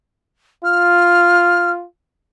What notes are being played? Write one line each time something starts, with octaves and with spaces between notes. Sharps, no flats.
F4 F6